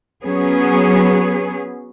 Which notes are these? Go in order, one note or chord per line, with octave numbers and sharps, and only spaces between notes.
F#3 B3 C#4 G#4